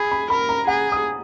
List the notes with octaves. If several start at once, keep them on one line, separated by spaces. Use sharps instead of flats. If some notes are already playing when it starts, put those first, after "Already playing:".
Already playing: G#4 B5
B5
A#4 B5
A#5
G#4 F#5
D#6